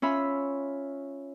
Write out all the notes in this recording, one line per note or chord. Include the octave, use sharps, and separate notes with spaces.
C#4 F4 E5 B5